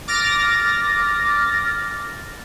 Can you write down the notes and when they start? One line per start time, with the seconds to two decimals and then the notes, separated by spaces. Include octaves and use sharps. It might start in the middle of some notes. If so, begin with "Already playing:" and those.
0.08 D6 F6 A6 A#6